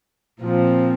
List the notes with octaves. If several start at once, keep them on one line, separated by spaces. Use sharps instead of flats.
A#2 F3 C4